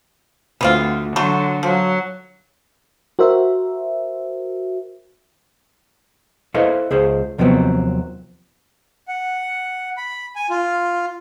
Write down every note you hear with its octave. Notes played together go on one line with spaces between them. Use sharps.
D2 B3 C4 F4
D3 F#3 A3 F#4 C6
F3 F#3
F#4 A#4 C5 E5
E4 A4 B4 C5 D#5 F5
C#2 G#4 C5
D#2 C3 F3 F#3 B3 C4
F#5
B5
G#5
F4